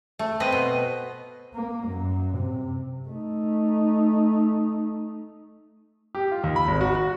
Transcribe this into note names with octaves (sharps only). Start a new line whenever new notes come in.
A3
C4 B4 D#5
B2
A#3
F#2
C3
A3 D#4
G4
F4
D#2
B5
G#1
F#4
F#4